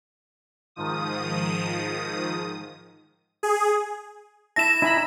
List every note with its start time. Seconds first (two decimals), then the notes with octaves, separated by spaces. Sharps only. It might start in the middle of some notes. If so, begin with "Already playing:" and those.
0.76 G#2 D#3 F3 D#6
3.43 G#4
4.56 E4 E5 A5 A#6 E7
4.82 D#4 E4 G#5 B5